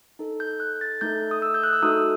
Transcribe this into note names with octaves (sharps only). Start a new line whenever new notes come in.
D#4 A4
G6
F#6
A6
A3 D#4 A4 G6
D#6
E6
G6
F#6
E6
A3 D#4 F#4 A4 D#6